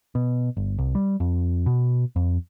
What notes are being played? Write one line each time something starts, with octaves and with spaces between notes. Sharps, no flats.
B2
G1
C2
G3
F2
B2
F2